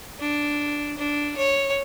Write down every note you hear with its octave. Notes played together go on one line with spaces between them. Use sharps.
D4
D4
C#5